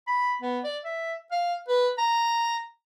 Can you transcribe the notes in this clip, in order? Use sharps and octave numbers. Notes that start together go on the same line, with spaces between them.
B5
B3
D5
E5
F5
B4
A#5